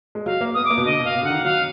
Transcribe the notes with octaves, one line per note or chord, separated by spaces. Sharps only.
G#3
F#3 F5
A#3
B3 D#6
D6
A#3
B2
D3 D#5
B2
F5
B2
D3 F#5
D#3
F#3 F5